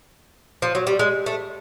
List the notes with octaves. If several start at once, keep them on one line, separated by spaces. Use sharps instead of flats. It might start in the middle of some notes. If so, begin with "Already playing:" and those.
F3
F#3
G3
G#3
A3